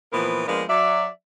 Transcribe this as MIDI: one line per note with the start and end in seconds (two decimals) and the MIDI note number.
0.12 0.42 46
0.12 0.42 52
0.12 0.42 53
0.12 0.42 59
0.12 0.42 70
0.12 0.42 72
0.47 0.62 53
0.47 0.62 56
0.47 0.62 58
0.47 0.62 59
0.47 0.62 62
0.47 0.62 70
0.68 1.07 54
0.68 1.07 74
0.68 1.07 76